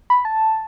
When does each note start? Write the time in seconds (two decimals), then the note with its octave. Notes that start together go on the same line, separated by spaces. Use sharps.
0.10 B5
0.25 A5